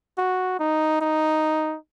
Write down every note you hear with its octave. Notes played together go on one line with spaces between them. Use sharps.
F#4
D#4
D#4